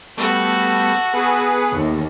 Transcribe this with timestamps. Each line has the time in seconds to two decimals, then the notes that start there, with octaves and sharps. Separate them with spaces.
0.17 G3 A3 B3 F#4 A4
1.13 B3 G#4 B4 F#5 C#6
1.75 D#2 A2